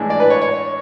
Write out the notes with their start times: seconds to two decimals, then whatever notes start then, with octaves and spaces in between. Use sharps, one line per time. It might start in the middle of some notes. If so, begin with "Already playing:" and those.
Already playing: A2 E3 G#3 D4
0.10 D5
0.20 B4
0.30 C#5
0.42 C#5